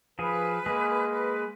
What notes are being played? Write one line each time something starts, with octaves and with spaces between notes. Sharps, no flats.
F3 G#4 B4
G#3 A#3 G#4
B4